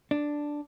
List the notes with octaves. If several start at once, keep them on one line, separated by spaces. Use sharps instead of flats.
D4